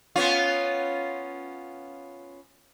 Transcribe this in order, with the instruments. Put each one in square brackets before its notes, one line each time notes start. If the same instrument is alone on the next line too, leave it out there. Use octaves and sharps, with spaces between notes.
[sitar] B3 C#4 F4